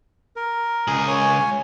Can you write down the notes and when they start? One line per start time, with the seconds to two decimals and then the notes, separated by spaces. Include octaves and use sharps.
0.36 A#4
0.88 C#2 G#4
1.08 C#5 G#5